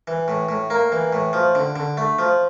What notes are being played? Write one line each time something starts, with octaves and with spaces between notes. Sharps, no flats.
E3
A2
A2
A#3
E3
A2
F3
D3
D3
A3
F3